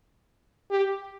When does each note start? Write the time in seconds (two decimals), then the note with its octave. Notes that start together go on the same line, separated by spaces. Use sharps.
0.71 G4